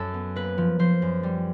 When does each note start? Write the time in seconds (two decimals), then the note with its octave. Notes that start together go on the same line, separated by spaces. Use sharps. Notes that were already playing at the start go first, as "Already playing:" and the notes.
Already playing: F#2 A4
0.14 B3
0.36 A#3 B4
0.58 F3
0.79 F3 C5
1.02 F#2
1.23 G3